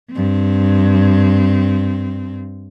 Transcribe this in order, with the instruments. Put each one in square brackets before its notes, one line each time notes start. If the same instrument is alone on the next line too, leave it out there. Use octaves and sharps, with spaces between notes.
[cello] G2 C4